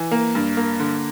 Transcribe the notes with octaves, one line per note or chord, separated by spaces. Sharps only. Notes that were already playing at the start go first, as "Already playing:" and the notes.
Already playing: E3
A#3
G2
A#3
D3